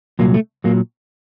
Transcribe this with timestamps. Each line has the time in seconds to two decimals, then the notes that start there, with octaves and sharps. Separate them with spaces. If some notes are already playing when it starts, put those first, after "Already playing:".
0.19 C2 A#2 F#3 A#3
0.34 A3
0.64 A#2 F#3 A#3